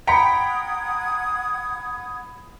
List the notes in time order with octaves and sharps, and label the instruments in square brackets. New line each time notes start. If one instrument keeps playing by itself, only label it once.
[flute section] F#5 D#6 G#6 [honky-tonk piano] G5 A#5 B6 [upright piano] B5 C#7